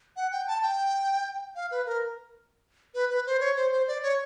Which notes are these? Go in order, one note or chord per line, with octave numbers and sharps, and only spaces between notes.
F#5
G5
A5
G5
F5
B4
A#4
B4
B4
C5
C#5
C5
C5
D5
C#5